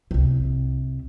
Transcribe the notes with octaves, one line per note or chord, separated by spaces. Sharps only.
C2 C3